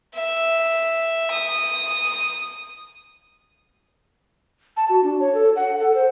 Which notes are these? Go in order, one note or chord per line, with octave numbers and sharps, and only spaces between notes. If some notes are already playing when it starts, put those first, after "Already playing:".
E5
D#6
A5
F#4
D4
C#5
A4
F#5
A4
C5